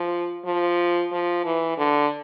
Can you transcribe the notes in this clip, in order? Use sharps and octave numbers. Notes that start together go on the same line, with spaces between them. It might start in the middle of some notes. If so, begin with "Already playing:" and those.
Already playing: F3
F3
F3
E3
D3